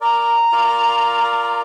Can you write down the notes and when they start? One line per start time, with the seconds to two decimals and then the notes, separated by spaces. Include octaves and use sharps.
0.01 A#4 D5 A#5
0.53 F4 A#4 D5